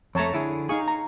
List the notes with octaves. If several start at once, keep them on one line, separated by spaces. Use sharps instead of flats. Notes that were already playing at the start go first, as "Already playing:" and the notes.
F2 A3 C#5 A5 A#5
D3 E4 G#4
D#4 G#4 F5 C#6
A#5